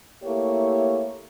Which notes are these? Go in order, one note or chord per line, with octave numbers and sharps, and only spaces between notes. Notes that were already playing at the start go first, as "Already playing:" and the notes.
A3 A#3 E4 G4 C#5